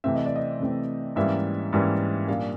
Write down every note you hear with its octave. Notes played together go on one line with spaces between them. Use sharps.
C3 E3 A3 C4 E5
D#5
D5
D#5
C3 E3 A3 C4
G#2 E3 G3 A#3 C#4 E5
G#2 E3 G3 A#3 C#4
A#2 G3 A#3 D4 F5